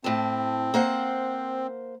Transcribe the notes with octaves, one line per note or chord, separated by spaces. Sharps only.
A2 C4 A5
A#3 C5 F#5